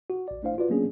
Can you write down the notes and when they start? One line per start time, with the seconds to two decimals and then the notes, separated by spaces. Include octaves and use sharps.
0.10 F#4
0.28 A#1 D5
0.43 A3 D4 E4 C5 F5
0.58 F4 F#4 B4 D5
0.70 F#3 A#3 B3 C#4 D4 G#4